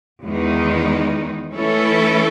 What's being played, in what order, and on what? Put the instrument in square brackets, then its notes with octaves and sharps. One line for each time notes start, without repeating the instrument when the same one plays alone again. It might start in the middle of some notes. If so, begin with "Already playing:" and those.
[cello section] E2 D#3 G#3 D#4
E3 A3 C#4 E4 A4